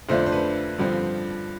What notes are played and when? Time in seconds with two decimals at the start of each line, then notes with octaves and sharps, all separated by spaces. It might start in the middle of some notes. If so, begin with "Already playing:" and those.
0.09 F2 D3 A3 D4 F4 C5
0.26 C5
0.32 B4
0.78 G2 D3 F3 C4